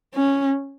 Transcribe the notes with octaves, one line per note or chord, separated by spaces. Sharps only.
C#4